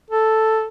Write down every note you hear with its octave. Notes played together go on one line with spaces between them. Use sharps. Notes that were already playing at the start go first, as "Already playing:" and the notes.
A4